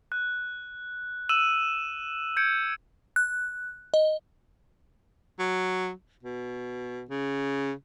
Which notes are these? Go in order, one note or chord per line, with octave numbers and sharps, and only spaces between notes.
F#6
E6 D#7 E7 F#7
G6 G#6 C#7 D7
F#6
D#5
F#3
B2
C#3